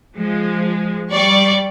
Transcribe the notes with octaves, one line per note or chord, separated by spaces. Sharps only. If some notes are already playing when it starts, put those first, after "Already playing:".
F3 G#3
G3 D5 C#6